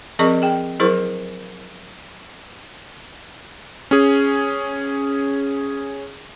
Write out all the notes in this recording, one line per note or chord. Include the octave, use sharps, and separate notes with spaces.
F3 C4 G#4 A#4 D#5 C#6
G#4 G5
F#3 E4 G#4 A#4 C5 C#6
C#4 G#4